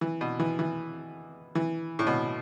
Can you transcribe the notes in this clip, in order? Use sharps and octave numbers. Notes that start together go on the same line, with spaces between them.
E3
B2
E3
E3
E3
A2
B2